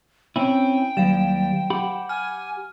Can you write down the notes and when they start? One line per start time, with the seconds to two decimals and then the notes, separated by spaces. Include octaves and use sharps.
0.36 C4 C#4 E4 G5
0.97 D#2 F#3 G3 F5 E7
1.70 G4 F#5 B5
2.09 G#5 F6